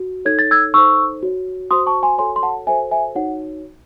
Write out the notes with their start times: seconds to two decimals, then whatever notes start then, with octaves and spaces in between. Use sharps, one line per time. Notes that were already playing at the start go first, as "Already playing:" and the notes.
Already playing: F#4
0.25 D#4 A4 C#5 G#6
0.39 A6
0.51 E6 G#6
0.74 D#4 A4 C5 C#6 E6
1.23 F#4 C#5
1.71 F#4 C5 C6 D#6
1.87 A5 C#6
2.03 G#5 C6
2.18 F#4 A4 C#5 G#5 C6
2.36 C6
2.43 F#5 A5
2.67 F#4 A4 C5 E5 G#5
2.91 E5 G#5
3.15 D#4 F#4 C#5 F#5